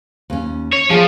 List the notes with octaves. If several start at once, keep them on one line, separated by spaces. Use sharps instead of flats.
D#2 C#4
C#5
F3 B3 F4 G#4